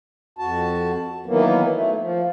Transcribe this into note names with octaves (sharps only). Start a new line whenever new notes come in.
F2 F#4 A5
D#3 E3 F#3 A#3 B3
A3
F3